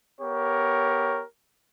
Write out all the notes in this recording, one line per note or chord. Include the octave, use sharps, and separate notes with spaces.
B3 G4 A#4 C#5